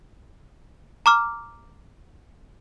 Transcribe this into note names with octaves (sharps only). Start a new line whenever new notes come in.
A#5 D6 F6